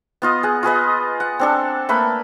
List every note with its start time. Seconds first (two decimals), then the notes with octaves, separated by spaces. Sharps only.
0.22 B3 F4 D#5
0.43 G#4 F#5
0.63 F4 G#4 B4 D#5
1.20 F#5
1.39 C4 D4 A4
1.89 A3 A#3 B4 B5